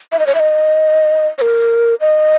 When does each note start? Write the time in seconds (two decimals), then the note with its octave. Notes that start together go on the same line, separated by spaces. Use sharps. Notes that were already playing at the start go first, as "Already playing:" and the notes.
0.12 E5
0.19 D#5
0.27 C#5
0.35 E5
0.40 D#5
1.38 C#5
1.41 A#4
2.01 D#5